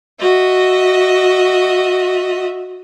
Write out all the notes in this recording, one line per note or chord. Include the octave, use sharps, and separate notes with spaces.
F#4 D#5 E5